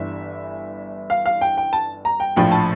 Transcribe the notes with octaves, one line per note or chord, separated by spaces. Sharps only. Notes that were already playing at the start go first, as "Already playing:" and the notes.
Already playing: G1 G2 E3 E5
F5
F5
G5
G5
A5
A#5
G5
A#1 A2 F3 G5
A5